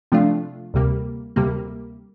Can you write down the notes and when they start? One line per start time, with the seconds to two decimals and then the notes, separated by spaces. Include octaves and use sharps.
0.12 C3 F3 A3 D4 F4
0.74 D2 C3 G3 A#3
1.36 D2 C3 G3 A#3